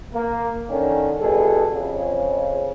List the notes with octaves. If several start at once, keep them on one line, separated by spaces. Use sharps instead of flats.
A#3
D3 D#3 C#4
B2 G3 E4 G#4 A4
F2 C#3